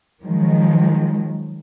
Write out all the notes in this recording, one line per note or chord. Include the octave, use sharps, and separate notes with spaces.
D#3 F3 F#3 G#3